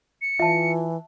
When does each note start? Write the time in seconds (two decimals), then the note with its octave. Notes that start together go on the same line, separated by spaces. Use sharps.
0.22 C#7
0.40 E3 F4 E5 A5